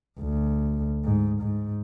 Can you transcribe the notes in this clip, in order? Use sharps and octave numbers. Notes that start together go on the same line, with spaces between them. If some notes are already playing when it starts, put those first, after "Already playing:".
D2
G#2
G#2